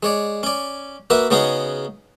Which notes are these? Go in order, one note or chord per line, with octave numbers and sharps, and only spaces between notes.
G#3 C#5 D5
C#4 D5
A#3 F#4 A#4 B4 E5
C#3 B3 C#4 D#4 F#4 G#4